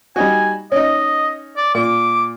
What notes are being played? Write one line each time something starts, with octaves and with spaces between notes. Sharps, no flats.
G3 D#4 F#4 G#5
C#4 D#4 D#5
D5
A#2 D6